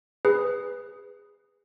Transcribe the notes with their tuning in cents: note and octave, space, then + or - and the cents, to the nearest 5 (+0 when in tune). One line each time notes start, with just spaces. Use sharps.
G#4 -20 B4 +0